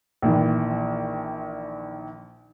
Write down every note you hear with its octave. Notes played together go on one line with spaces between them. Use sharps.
A#1 D#3 E3